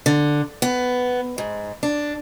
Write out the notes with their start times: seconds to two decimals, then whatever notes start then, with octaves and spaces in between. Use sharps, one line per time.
0.06 D3
0.62 B3
1.38 G#2
1.83 D4